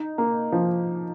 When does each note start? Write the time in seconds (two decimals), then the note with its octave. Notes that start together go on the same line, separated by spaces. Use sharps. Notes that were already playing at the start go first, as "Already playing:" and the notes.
Already playing: D#4
0.18 A#3
0.52 F3